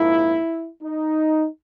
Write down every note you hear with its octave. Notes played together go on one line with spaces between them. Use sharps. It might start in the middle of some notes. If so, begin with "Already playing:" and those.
Already playing: A#1 G#2 F3 A#3 E4
D#4